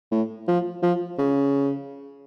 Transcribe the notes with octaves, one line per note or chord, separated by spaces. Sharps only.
A2
F3
F3
C#3